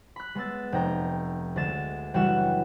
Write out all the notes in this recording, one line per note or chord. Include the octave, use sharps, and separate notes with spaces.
B5 F#6
G#3 B3 E6 A6
F1 G5 A#5
D2 G#3 D4 A6 E7
F#1 E3 G3 F#4 F#5 E7